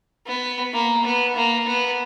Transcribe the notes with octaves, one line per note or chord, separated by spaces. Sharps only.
B3
A#3
B3
A#3
B3